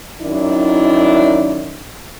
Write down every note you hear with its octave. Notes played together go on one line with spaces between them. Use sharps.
F#2 D#3 D4 E4